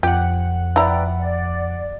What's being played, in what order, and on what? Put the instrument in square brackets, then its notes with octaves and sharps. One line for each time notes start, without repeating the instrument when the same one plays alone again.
[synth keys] F2 F#5 [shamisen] G4
[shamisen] E4 A#5 [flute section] B4 D5 G5
[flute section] D5